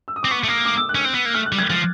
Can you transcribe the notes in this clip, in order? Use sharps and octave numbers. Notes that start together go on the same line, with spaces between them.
E6
D#6
C4 D6
B3 C#6
A3
A#3 D6
D6
E6
F#6
C#4
C4
B3
A#3
A3 F6
F#6
G3
G#6
F3 A6